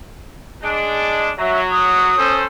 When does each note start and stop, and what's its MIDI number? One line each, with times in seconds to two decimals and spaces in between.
0.63 1.32 56
0.63 1.32 62
1.39 2.13 54
1.39 1.59 76
1.72 2.36 87
2.18 2.44 61
2.18 2.44 69
2.18 2.44 72